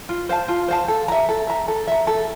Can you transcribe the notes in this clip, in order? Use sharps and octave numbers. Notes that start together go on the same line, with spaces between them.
F4
C5 F5 A5
F4
C5 F5 A5
A4
E5 A#5
A4
E5 A#5
A4
E5 A#5
A4